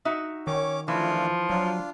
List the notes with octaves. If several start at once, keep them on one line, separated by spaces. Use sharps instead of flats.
D#4 F#4 E5
D#3 C#4 C#5 D6
E3 F3 A3 D4 F4
F#3 D4 F4